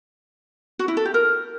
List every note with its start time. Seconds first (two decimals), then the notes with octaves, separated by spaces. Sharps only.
0.79 F#4
0.88 E4
0.97 A4
1.05 G4
1.14 A#4